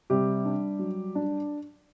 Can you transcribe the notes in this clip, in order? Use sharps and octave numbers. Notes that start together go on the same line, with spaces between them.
C3 G3 G4
D4
F#3
D4